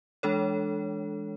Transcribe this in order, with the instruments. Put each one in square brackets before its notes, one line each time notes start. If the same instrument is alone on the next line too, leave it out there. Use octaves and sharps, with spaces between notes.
[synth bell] E3 G#3 D4 A4 C#5